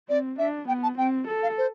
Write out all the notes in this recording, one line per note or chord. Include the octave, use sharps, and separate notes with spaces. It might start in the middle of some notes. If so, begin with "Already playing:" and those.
C4 D5
D4 E5
B3 G5
A5
C4 G5
A4
F5
C5